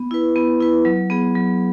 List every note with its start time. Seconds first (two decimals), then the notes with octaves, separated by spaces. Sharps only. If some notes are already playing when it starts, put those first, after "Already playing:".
Already playing: B3
0.11 E4 B4
0.36 B3
0.61 E4 B4
0.85 F#3
1.10 B3 G#4
1.35 F#3